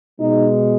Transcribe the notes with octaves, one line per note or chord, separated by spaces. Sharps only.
B2 G#3 D#4